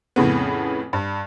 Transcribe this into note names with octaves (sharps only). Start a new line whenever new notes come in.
F2 A2 C#3 B3
G2